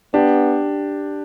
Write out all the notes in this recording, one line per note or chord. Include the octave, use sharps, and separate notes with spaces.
B3 D4 G4